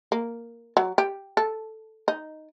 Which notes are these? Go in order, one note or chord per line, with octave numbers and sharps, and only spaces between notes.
A#3
F#3
G4
A4
D#4